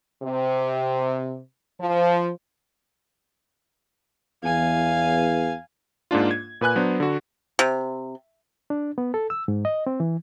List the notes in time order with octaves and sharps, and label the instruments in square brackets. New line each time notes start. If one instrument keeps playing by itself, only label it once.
[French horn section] C3
F3
[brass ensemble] E2 [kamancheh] F5 G#5
[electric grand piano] G#2 A#3 D4 F4
G#6
A#2 B4 G#5 F#6
F#3 B3 D4 C5
D3 F#4
[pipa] C3
[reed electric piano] D4
B3
A4
E6
G#2
D#5
C4
E3